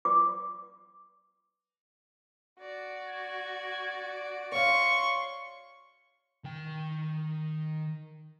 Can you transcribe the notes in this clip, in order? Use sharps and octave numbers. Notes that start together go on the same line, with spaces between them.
D6
F#4 D5
G#6
C#5 F5 C6 C#6
D#3 G5